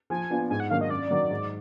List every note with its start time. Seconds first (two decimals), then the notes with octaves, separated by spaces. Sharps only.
0.10 F3 G#5
0.30 B3 D4 F4
0.50 G#2 G#5
0.60 F#5
0.70 D#3 F#3 A#3 D4 F5
0.81 D#5
0.90 F#2 D5
1.11 D#3 F#3
1.31 G#2